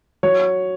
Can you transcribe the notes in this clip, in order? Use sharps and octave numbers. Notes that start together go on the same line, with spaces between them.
F#3 C#5